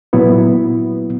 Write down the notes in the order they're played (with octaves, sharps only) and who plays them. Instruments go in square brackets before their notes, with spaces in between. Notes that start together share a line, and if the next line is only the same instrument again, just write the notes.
[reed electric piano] A#2 F#3 B3 E4